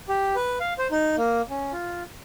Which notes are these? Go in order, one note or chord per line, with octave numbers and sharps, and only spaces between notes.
G4
B4
F5
C5
D#4
A#3
C#4
F4